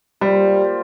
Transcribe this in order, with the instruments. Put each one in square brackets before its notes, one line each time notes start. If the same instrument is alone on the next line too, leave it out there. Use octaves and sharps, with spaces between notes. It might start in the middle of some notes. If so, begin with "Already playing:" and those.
[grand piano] G3 [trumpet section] A#3 F4 C5